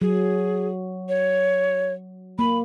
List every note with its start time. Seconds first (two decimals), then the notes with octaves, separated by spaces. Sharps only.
0.01 F#3 G#4
1.09 C#5
2.39 A#3 B5